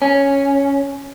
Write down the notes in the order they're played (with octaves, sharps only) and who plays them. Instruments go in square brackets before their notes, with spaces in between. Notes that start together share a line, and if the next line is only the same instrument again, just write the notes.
[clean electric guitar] C#4